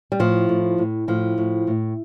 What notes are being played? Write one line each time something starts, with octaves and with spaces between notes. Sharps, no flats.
G3
A2 F3
A2
A2
A2 F3
A2
A2